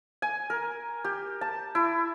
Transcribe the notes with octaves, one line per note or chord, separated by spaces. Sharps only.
G#5
A#4
G4
A5
E4